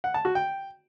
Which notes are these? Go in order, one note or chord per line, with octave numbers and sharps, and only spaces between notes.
F#5
A5
F#4
G5